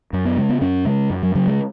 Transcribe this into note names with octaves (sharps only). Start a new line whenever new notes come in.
F#2 F#3
B3
C#3 G#3
B3
F#2 C#4
C#3 G#3
F#2
F#3
C#3 F#3
G#3